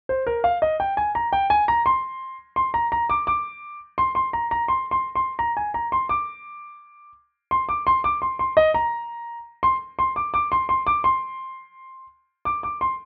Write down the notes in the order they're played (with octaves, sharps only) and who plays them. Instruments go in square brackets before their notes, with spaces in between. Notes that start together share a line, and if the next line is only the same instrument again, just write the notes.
[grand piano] C5
A#4
F5
D#5
G5
G#5
A#5
G5
G#5
A#5
C6
C6
A#5
A#5
D6
D6
C6
C6
A#5
A#5
C6
C6
C6
A#5
G#5
A#5
C6
D6
C6
D6
C6
D6
C6
C6
D#5
A#5
C6
C6
D6
D6
C6
C6
D6
C6
D6
D6
C6